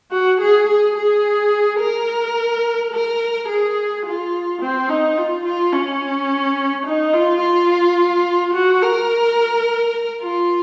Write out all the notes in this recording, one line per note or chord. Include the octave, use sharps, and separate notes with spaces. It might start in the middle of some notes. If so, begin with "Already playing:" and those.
F#4
G#4
G#4
G#4
A#4
A#4
G#4
F4
C4
D#4
F4
F4
C#4
D#4
F4
F4
F#4
A#4
F4